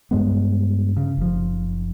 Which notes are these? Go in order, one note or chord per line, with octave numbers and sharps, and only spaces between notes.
G2 G#3 B3
C#3
F#1 F3